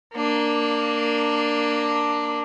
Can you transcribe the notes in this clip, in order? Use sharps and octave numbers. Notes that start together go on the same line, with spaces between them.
A#3 D4